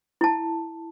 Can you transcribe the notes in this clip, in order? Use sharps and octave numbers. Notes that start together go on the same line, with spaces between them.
E4 A5